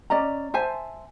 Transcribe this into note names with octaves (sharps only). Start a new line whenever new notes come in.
C#4 D5 D#5 A#5
C5 E5 G#5 A5